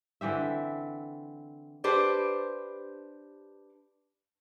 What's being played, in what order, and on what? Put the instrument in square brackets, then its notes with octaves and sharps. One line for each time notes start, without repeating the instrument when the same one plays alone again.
[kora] D3 E3 C4 E5
[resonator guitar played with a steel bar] D4 G4 B4 C5